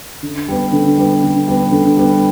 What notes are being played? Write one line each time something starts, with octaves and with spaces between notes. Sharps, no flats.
D3
G3 B3
D3
G3 B3
D3
G3 B3
D3
G3 B3